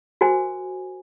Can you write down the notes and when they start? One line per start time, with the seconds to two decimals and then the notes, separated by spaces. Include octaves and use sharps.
0.21 F#4 A#4 C5 G#5